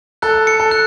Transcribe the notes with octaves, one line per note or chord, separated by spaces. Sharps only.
A4 F#6
C#7
A4
F#6